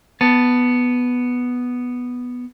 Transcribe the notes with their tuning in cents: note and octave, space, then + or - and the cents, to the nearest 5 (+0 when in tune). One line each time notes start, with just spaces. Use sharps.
B3 +0 A5 +0